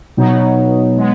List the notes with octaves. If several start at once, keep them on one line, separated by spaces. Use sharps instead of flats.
B2 F#3 B3 D#4
G#3 B3